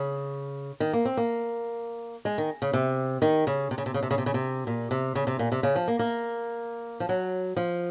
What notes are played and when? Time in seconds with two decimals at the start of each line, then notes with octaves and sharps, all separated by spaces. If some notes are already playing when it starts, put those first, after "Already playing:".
Already playing: C#3
0.80 D#3
0.93 A#3
1.05 C4
1.17 A#3
2.25 G#3
2.38 D#3
2.62 C#3
2.73 C3
3.22 D#3
3.47 C#3
3.71 C3
3.78 C#3
3.86 C3
3.94 C#3
4.02 C3
4.11 C#3
4.18 C3
4.26 C#3
4.34 C3
4.67 A#2
4.91 C3
5.15 C#3
5.27 C3
5.39 A#2
5.52 C3
5.63 C#3
5.76 F3
5.88 A#3
5.99 A#3
7.00 F3
7.09 F#3
7.56 F3